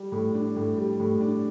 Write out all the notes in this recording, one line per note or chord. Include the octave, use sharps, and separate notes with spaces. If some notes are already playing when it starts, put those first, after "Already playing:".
Already playing: G3
A2
D4
A2
G3
A2
D4